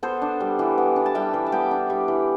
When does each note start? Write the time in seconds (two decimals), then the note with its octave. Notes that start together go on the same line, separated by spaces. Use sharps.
0.03 B3 A4 C5
0.22 D4
0.40 G3
0.59 E3
0.78 B3
0.96 D4
1.06 A5
1.15 G3 E5 G5
1.34 E3
1.46 A5
1.52 B3 G5 B5
1.71 D4
1.90 G3
2.08 E3